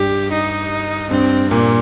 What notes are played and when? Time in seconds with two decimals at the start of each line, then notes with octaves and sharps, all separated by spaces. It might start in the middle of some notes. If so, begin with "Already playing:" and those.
Already playing: G2 G4
0.33 D#4
1.11 G2 C4
1.51 A#2 A#3